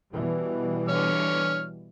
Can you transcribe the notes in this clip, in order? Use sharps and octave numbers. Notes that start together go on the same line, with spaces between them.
B2 E3 G3
D3 C#5 F6